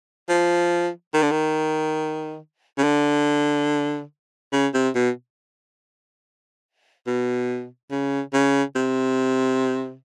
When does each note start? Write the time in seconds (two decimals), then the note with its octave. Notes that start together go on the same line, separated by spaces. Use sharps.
0.29 F3
1.14 D#3
1.23 D3
1.31 D#3
2.78 C#3
2.84 D3
4.52 C#3
4.74 C3
4.95 B2
7.07 B2
7.91 C#3
8.34 C#3
8.76 C3